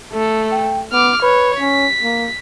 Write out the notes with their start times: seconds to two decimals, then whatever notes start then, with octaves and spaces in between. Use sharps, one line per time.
0.12 A3 A4
0.52 G5
0.92 B3 D6 F6
1.22 B4 C#5
1.59 C#4 B6
2.03 A#3